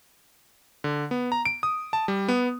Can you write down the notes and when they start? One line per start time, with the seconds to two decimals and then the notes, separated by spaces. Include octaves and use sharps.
0.84 D3
1.11 B3
1.32 A#5
1.45 D7
1.63 D#6
1.93 A5
2.08 G3
2.28 B3